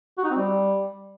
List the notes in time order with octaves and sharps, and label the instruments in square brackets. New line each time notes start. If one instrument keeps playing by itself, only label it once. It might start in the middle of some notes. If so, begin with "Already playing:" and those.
[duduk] F#4
D#4
C4
G3